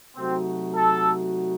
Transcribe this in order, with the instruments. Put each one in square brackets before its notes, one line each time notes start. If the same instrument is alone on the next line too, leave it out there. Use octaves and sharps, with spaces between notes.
[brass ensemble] C3 F#3 A3 D#4 F#4 [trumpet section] C4
[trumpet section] A4